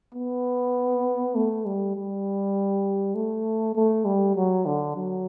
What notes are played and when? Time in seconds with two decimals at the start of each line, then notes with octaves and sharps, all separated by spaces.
0.15 B3
1.35 A3
1.66 G3
1.96 G3
3.15 A3
3.75 A3
4.05 G3
4.36 F#3
4.66 D3
4.96 F#3